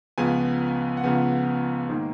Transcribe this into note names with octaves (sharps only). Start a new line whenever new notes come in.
C#2 C#3 F3 B3 G#5
F#5
C#2 C#3 F3 B3 G#5
G#2 D#3 A#3